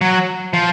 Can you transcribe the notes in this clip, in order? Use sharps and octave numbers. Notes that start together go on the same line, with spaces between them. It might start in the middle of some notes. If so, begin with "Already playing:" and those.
F#3
F3